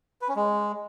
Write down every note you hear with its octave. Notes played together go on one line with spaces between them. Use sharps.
B4
C#4
G#3